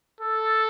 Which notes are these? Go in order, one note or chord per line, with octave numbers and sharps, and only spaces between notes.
A4